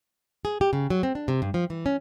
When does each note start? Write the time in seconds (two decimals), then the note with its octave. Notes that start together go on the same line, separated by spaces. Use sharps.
0.45 G#4
0.61 G4
0.73 C#3
0.90 F#3
1.03 C4
1.15 D4
1.28 C3
1.42 G2
1.54 F3
1.70 E3
1.86 C#4